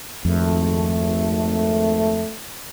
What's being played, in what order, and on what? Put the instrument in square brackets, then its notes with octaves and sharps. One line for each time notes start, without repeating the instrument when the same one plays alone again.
[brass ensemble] G#1 A3 [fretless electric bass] F2